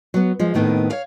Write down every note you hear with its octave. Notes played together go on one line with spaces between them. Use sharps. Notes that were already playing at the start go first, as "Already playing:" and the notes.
F#3 B3
F3 G#3
D#2 A2 D#3 B3 C4
C#5 F5